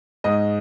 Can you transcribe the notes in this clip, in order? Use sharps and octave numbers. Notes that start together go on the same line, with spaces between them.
G#2 D#5